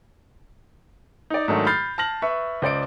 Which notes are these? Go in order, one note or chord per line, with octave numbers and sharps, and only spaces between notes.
D#4 D5
G#2 D#3 F#3 A3 D4 F#4
B5 F6 G6 A6 C7
A5 F6 A#6 F#7
B4 E5 C#6
C#2 C5 D5 D7